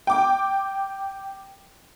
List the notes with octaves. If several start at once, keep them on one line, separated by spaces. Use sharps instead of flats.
G5 D6